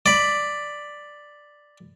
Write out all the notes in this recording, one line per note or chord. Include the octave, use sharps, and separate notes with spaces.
D5 B5